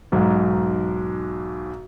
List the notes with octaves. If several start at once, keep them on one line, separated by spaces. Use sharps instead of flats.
B1 G#2